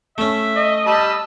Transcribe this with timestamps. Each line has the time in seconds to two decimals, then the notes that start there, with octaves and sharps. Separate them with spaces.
0.18 A3 C#4 E5
0.56 D#5
0.86 G3 A5 B5 E6